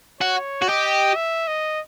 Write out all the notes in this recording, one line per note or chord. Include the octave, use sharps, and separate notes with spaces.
F#4 C#5
F#4
G4 D#5
E5
D#5